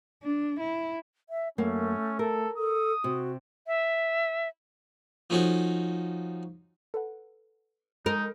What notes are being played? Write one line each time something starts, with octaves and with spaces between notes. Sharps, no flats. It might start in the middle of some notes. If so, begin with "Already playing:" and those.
D4
E4
E5
F#2 A3 A#3 C#4
A4 A#4
A4 D#6
C3 F#4
E5
F3 A3 C#4 D#4 F#4
A4 B4 F#5
G#3 D#4 A#4